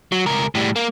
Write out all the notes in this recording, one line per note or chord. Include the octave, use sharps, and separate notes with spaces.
F#3
C#2 A#4
A2 G3
A#3